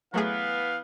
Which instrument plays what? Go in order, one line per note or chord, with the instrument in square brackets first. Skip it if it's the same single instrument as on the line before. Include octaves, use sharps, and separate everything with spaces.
[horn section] E3 B3 [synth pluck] F#3 A3 G#4 [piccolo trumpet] F5